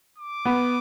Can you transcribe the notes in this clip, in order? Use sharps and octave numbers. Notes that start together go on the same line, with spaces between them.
D6
B3